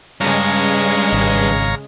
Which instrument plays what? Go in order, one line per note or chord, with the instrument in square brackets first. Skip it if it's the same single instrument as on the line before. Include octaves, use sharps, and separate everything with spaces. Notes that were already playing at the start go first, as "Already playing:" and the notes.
[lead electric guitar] G2 [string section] C#3 G#3 [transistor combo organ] C#5 F5 A#5
[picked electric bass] G#1